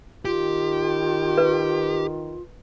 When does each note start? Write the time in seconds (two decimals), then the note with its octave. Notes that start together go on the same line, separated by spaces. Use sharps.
0.25 D#3 F4 G4
1.38 B4